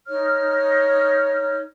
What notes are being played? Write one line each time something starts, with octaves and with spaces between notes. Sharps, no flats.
D#4 C#5 F6